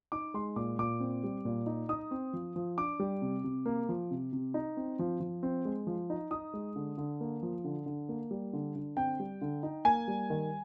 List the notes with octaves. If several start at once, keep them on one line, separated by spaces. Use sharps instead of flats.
D#4 D6
G#3 C6
A#2 D6
A#2 D6
C4
G3
A#2
D#4
D#4 D#6
C4
F3
F3
D4 D6
G3
C3
C3
A#3
F3
C3
C3
D#4
C4
F3
F3
C4
G#3
F3
D#4
D#4 D#6
G#3
D3
D3
A#3
F3
D3
D3
A#3
G3
D3
D3
C4 G5
G3
D3
D#4
A#3 G#5
G3
D#3